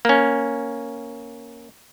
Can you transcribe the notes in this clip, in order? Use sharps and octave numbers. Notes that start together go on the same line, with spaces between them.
A#3 C#4